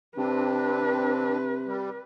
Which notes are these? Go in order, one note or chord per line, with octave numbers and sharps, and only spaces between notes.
C3 C4 D4 B4
G3